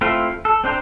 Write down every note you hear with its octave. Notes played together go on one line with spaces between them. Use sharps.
A3 C4 E4 F4
A4
C4 D4 C5 G5 A#5